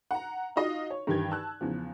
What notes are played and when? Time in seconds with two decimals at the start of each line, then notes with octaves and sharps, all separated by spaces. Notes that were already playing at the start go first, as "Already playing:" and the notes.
0.11 F#5 A#5
0.56 D#4 F4 F#4 D#5 F5
0.90 C#5
1.07 G2 D#3 E3 G4 G5 G#6
1.31 A5 E6 F#6
1.61 E2 C#3 F3